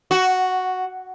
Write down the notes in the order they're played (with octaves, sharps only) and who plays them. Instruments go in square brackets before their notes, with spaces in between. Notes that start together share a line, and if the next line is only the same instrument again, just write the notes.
[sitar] F#4